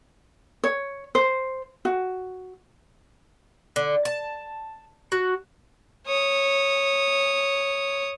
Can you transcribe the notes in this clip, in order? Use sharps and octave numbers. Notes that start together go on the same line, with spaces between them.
C#5
C5
F#4
D3
A5
F#4
C#5 D#6